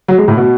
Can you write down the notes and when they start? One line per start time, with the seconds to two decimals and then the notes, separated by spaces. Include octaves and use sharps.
0.08 F#3
0.18 G#3
0.28 A2
0.37 B2